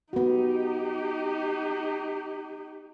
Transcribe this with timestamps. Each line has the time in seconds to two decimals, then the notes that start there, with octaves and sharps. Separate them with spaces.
0.13 B3 D#4 F#4 G4